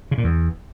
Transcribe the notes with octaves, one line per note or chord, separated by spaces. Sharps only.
C#3
A#2
E2